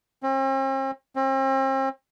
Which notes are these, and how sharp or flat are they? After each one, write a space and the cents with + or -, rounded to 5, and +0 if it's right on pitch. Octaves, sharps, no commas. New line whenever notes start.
C4 +45
C4 +40